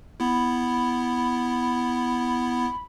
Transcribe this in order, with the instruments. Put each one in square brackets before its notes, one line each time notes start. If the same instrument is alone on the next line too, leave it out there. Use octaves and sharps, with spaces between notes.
[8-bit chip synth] B3 E4 [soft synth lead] B5